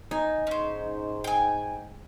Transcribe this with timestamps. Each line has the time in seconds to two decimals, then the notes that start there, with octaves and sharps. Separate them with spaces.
0.11 D#4 G#5
0.47 G#2 C#4 C5
1.24 G5 G#5